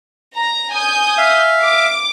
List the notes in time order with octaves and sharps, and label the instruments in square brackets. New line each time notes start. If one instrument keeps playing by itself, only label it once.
[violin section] A#5
G#5 D#6 G6
[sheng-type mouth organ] E5 F5
[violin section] D6